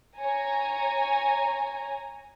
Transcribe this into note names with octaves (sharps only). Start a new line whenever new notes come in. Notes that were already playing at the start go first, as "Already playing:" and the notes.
C#5 G#5 A#5